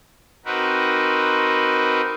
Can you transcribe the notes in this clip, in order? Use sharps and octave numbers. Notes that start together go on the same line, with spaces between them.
C4 D#4 F#4 A#4 B4